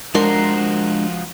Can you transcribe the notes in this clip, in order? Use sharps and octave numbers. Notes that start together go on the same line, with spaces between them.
F3 G#3 D4 F#4 A#4 C5 C6